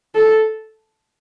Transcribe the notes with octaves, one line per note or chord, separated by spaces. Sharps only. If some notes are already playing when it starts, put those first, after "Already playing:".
A4